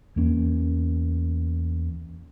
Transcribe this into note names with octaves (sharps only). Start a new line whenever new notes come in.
E2 A#3 C#4